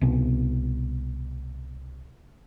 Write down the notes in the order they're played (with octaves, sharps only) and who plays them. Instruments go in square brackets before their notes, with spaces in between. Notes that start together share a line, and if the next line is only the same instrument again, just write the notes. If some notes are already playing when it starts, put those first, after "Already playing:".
[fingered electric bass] C2 B2